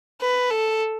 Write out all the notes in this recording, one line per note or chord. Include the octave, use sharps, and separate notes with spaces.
B4
A4